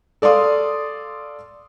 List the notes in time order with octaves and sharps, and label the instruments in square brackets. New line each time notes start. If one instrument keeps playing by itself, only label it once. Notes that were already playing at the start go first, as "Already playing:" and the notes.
[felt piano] A4 D5 F5 C6 D#6